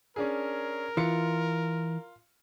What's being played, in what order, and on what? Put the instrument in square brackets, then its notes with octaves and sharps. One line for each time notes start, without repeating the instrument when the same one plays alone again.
[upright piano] C#4 D4 G#4 [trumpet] A#4
[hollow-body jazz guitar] E3 [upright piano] F4 C#7